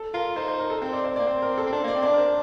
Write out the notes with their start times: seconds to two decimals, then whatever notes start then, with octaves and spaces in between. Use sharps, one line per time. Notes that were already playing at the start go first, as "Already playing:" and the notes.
Already playing: A4
0.14 F4 A#4
0.36 D#4 C5
0.48 C5
0.59 A#4
0.70 A4
0.82 C4 C5
0.93 D5
1.04 C5
1.16 A#3 D5
1.27 C4 C5
1.42 A#4
1.58 A4
1.67 C4
1.72 D4 C5
1.84 A#3 D5
1.95 C4
2.03 D4 D5
2.13 A#4
2.18 C5